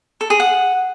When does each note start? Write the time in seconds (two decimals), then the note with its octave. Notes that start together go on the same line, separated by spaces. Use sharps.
0.21 A4
0.30 G#4
0.40 F#5